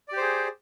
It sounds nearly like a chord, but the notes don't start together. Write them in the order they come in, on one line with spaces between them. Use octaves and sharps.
D5 G4 C5 G#4